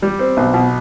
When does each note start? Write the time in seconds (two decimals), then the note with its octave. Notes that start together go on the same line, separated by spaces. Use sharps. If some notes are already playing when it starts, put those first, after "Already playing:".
0.02 G3
0.19 C4
0.37 B1
0.54 B2